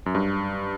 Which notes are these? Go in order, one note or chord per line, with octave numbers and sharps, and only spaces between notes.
F#2
G2